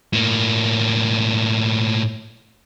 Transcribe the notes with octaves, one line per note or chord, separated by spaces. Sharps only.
A2 A#3